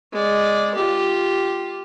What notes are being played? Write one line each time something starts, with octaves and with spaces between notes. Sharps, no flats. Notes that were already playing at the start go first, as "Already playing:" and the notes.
G#3 D5
F4 G4